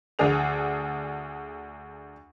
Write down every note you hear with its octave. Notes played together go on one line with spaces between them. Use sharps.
D2 D4 G#4 F7